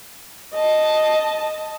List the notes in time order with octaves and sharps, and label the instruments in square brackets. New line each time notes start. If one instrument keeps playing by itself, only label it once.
[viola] D#5 A5